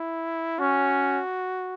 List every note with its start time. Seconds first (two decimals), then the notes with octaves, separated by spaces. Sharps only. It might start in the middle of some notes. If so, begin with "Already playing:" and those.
Already playing: E4
0.59 C#4 F#4